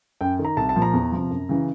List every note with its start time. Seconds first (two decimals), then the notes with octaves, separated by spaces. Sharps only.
0.21 F#2 G5
0.39 D#3
0.45 A#5
0.57 C2 A5
0.69 A5
0.76 A#2 F3
0.82 A#5
0.93 E2
1.12 C3 F3
1.30 F#2
1.49 C#3 E3